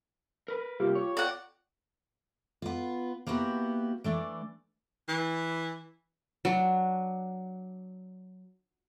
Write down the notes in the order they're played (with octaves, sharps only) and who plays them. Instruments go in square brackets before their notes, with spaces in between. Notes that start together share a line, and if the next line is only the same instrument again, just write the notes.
[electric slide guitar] A#4 B4
[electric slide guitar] C3 G3 A#3 [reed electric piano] F4 [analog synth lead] G4
[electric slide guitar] C#5
[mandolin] D5 F#5 [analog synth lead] G5
[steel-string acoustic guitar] B3 F4
A#3 B3 E4 F#4 G4
E3 A3 D4
[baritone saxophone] E3
[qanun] F#3 D4